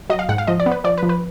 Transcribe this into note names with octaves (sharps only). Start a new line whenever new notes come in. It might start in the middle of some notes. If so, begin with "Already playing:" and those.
F#3 D#5
F5
G#2 F#5
F5
F3 D#5
D5
B3
B4
F3 D5
B4
F3
B4